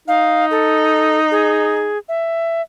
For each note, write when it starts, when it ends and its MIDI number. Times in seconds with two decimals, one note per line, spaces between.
0.08 1.94 63
0.08 0.45 77
0.51 1.19 69
1.31 1.98 68
2.09 2.62 76